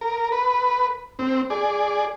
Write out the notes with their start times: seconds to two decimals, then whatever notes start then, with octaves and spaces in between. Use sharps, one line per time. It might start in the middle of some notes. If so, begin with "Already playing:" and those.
0.01 A#4
0.32 B4
1.19 C4
1.50 G#4 D5